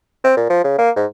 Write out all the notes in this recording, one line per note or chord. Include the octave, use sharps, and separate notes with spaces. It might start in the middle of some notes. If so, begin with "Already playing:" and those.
C4
A#2
F3
C#3
A#3
G#2